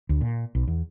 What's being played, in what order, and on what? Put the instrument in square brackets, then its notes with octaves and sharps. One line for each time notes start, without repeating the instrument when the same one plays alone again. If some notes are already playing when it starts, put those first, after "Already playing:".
[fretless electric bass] D2
A#2
B1
E2